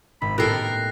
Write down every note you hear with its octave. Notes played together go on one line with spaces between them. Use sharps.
G#1 B5
A2 B3 G4 A4 A#4 F#6 A#6 C7